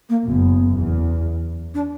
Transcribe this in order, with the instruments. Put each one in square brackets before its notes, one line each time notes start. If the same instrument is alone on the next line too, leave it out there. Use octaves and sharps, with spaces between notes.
[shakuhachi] A#3
[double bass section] F#1 F#2 [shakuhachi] B3
[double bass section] E2
[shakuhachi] D4